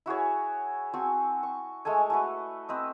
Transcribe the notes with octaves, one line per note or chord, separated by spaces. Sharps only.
E4 F#4 G#4 C#5
C4 F#4 G#5 A5
C#6
G#3 A3 A4 G#5
A3 F#4 B4
C4 B4 D#5